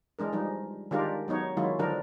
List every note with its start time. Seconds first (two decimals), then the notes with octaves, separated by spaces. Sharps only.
0.19 E3 G#3 D4 A#4
0.33 F3 G3 D#4
0.91 D#3 G#3 D4 F4 G4 A#4
1.28 F#3 B3 D#4 C#5
1.57 D#3 F#3 G#3 E4 F4
1.79 D3 F3 D4 D#4 A#4